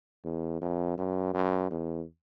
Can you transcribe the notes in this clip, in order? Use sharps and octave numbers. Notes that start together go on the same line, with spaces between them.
E2
F2
F#2
F#2
E2